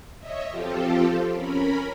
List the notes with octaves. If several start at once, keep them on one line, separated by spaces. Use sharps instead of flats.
C#5 D#5 E5
F3 C4 F4 G4 A4
C#4 A#4 B5